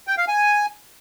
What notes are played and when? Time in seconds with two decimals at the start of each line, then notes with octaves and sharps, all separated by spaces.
0.07 G5
0.18 F5
0.28 G#5